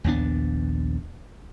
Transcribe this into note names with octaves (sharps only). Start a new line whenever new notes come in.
A#1 D#2 B3 D4